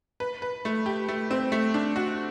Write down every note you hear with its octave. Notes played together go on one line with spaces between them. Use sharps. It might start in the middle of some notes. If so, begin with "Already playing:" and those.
B4
B4
A3
G4
A3
C4
A3
D4
F#4